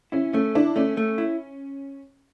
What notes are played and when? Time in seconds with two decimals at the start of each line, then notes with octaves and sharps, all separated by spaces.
0.12 C#4 E4
0.33 A3 C#4
0.55 D4 E4
0.76 A3 C#4
0.97 A3
1.18 E4